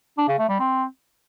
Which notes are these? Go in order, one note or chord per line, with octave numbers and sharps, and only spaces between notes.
D4
C#3
A3
G3
C4